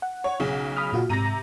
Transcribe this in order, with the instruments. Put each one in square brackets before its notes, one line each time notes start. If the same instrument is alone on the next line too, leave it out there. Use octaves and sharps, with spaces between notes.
[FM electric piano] F#5
[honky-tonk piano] C#5
B1 C#3
[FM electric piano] B5 D#6 F6
A#2 F4 F#4
[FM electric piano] G#2 A#6 [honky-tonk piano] C3 A#5 D#7